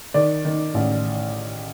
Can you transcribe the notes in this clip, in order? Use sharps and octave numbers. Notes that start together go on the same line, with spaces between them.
D#3 D5
D#3
A1